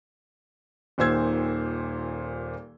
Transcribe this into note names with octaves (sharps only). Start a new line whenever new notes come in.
D#1 A#2 D#3 C5 E6 G#6